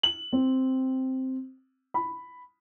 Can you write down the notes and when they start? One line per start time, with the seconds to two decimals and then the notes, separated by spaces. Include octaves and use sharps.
0.03 F#7
0.33 C4
1.94 B5